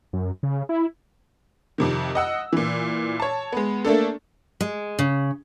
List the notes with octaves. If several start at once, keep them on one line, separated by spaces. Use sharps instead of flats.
F#2
C#3
E4
F2 C3 D#3
D#5 F#5 E6
A#2 E3
C#5 A5
G#3 B3
A3 A#3 D4 A4
G#3
C#3